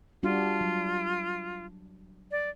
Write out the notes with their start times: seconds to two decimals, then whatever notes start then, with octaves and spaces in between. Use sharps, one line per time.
0.23 G3 D4 F4 F#4
0.61 F#3
2.31 D5